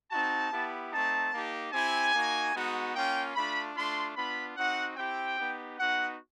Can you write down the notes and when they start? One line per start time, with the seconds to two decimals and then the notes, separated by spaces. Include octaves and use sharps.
0.11 C4 D#4 F#4 A5
0.52 B3 E4 G4
0.93 A3 C4 D#4 A5
1.32 A#3 D#4 G4
1.73 C4 E4 G4 G#5
2.14 A#3 D#4 F#4
2.54 G#3 B3 D#4 F#4
2.95 A#3 C#4 F4 G5
3.35 A3 D4 F4 B5
3.76 A3 D4 F4 C6
4.16 B3 D4 F4 B5
4.57 C4 D#4 F#4 F#5
4.97 C4 E4 G4 G5
5.37 B3 D#4 G4
5.78 B3 D#4 F#4 F#5